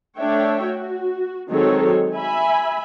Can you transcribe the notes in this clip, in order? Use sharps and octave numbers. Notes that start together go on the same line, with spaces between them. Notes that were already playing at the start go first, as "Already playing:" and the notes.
A3 D4 C#5 E5 G5
F#4
D#3 F#3 G#3 C4 A4 C#5
E5 G#5 B5